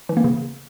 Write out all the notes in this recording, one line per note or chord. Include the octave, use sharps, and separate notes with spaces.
E3
A#3
C#3